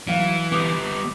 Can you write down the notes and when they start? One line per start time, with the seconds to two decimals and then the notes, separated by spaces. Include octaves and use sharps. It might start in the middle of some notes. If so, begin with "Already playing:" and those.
0.07 E3 F#3 F5
0.52 G3 B3 D6 D#6 G6